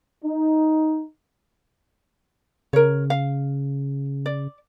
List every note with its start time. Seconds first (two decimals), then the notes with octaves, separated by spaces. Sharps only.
0.24 D#4
2.73 C#3 A#4 C#5
3.10 F5
4.26 D5